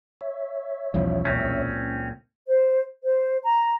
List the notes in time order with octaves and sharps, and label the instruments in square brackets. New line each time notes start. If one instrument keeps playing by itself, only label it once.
[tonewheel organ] C#5 E5
[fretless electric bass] B1 E2 G3 [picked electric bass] C#3 F3
[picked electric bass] C#2 A#2 [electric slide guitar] C4 C#4
[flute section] C5
C5
A#5